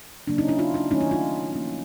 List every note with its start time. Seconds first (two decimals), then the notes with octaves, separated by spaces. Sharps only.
0.27 C#3 F#3 A#3 D4
0.38 C#4 D#4
0.48 D4 E4
0.59 D#4 F4
0.74 D4 E4
0.91 D#3 F#3 A3 C#4 D#4
1.01 D4 E4
1.11 D#4 F4
1.52 F3 A#3 C#4